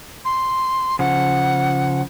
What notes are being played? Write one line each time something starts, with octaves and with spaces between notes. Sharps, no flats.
C6
C#3 F3 F#5